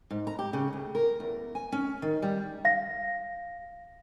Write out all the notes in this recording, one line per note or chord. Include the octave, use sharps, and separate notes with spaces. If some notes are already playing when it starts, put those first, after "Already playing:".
G#2
A#5
G4
C#3
D2
A#4
E2
G#5
C#4
D#3
G3
F5 A#6